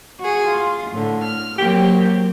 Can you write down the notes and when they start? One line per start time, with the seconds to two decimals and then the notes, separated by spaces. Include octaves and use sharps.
0.20 F#4 G#4
0.48 F4
0.91 A2 D3
1.25 F6
1.58 F#3 A#3 C4 G4